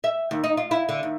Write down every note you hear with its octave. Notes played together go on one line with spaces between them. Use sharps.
E5
D#2
D#4
F4
E4
D3
D#2